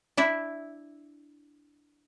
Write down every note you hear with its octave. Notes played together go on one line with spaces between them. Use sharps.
D4 E4 E5